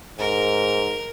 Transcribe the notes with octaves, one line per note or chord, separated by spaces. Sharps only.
G#2 A#4